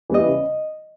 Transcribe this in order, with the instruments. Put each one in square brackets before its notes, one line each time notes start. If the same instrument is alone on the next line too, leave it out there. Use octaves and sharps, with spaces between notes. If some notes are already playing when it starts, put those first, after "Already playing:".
[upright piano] E3 G3 B3 E4 [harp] D#5
[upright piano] C#3